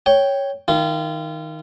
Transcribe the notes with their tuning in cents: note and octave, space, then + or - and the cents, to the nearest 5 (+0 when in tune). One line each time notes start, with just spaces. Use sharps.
C#5 +0 G5 +0
D#3 +10 F4 -30